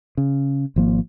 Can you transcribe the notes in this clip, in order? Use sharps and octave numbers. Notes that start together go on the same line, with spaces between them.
C#3
G#1 F3 A#3